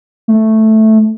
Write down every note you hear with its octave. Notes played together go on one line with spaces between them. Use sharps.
A3